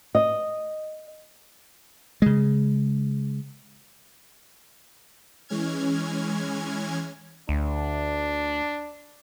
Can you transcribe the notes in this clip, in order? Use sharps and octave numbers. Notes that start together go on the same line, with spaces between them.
D#5
C#3 G#3
E3 G#3 C#4 F6 G#6
D2 D4